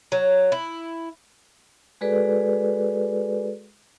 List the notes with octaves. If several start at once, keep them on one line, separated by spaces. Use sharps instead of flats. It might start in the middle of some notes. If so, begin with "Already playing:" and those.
F#3
E4
G#3 F#4 G#4 A4 B4 D5